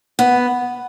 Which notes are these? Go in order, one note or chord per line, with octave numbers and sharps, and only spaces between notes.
B3